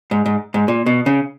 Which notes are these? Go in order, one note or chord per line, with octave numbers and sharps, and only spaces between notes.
G#2
G#2
G#2
A#2
B2
C#3